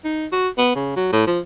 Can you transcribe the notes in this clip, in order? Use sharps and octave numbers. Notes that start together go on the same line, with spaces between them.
D#4
F#4
B3
C#3
F#3
A2
F3